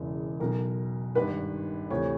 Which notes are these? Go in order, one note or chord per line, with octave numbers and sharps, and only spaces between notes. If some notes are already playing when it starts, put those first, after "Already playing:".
Already playing: E1 E2 C#3 E3
B1 B2 A#4
G#1 G2 D#3 B4
D2 C3 E3 C#5